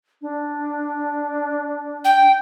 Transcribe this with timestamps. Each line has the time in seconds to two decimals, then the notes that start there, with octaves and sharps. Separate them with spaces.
0.22 D4
2.05 G5